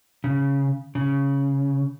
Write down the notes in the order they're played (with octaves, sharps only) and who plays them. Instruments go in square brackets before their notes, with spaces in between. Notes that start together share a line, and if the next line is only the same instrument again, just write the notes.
[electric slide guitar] C#3
C#3